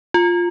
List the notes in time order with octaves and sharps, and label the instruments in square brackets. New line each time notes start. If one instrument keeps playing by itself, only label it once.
[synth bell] F4